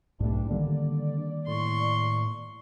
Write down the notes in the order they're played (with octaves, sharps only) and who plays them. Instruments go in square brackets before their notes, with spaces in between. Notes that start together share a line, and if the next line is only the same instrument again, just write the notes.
[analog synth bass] B1 [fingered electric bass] G#2 A3 [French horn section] E3 G3 D4
[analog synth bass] D3 [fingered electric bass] D#3 G3 A#3 [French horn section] D5
[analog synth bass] A2 [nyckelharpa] C6 C#6